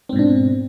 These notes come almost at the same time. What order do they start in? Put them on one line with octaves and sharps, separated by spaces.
C4 G#2 B2 D4